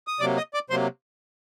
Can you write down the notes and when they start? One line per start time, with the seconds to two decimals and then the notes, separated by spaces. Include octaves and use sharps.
0.07 D#6
0.20 C3 F#3 A#3 D5 D6
0.37 D#5 D#6
0.54 D5 D6
0.70 C3 F#3 A#3 C5 C6